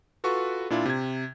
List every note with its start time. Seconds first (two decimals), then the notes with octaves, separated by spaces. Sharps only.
0.24 F4 F#4 A4 B4 C#6
0.70 A#2 D4 E4 F4 D5
0.85 C3 G#6